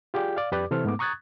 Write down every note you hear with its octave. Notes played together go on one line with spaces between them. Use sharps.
F4 G4 G#4 D5 G5
D5 F5
F2 G4 B4 D5 D6
C3 E3 A4 C5 F6
G#2 A3 B3 D6
A#5 C#6 D#6 F#6 G#6 A6